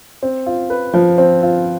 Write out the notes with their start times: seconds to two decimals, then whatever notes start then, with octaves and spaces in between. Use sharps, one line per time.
0.23 C4
0.46 F4
0.70 B4
0.94 F3
1.18 C4
1.43 F4